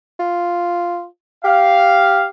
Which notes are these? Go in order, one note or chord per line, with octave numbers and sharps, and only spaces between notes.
F4
G4 F5